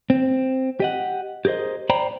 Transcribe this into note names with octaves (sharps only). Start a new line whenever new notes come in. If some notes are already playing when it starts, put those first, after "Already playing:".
C4
G4 D#5 F#5
G4 G#4 A#4 C5 D#5
C5 D5 G5 A#5 B5